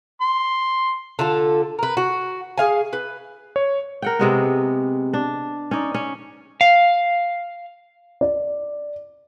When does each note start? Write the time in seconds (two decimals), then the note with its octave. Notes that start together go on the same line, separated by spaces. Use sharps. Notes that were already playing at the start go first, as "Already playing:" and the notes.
0.21 C6
1.19 D3 F4 A4
1.79 A#4 B4
1.97 F#4
2.58 G#4 F5 G#5
2.93 B4
3.56 C#5
4.02 A#4 F#5 G5
4.19 C3 G#3 B3
5.14 D4
5.71 C#4 D#4 D5
5.94 C#4
6.61 F5
8.21 D5